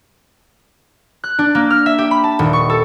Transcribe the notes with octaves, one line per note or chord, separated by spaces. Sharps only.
F#6
D4
A#3
F6
E5
G4
B5
A5
D#1
C#6
A4